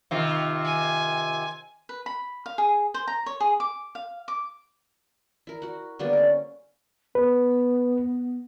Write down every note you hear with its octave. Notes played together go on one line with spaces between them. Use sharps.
C3 D#3 F4
G#5
B4
B5
F5
G#4
C5
A#5
C#5
G#4
D6
F5
D6
E4 A#4
F#4 F#5
D3 G3 A#3 B3
C#4 A#4
B3 B4